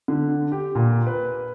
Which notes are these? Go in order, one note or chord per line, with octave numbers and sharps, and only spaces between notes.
D3
G4
A#2
B4